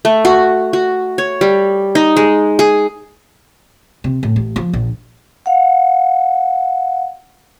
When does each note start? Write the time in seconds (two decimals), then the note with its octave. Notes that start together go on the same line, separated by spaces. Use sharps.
0.05 A3
0.25 F#4
0.73 F#4
1.18 C#5
1.41 G3
1.95 D#4
2.16 G#3
2.59 G#4
4.04 C3
4.23 A2
4.36 A1
4.56 F3
4.73 A#1
5.46 F5 F#5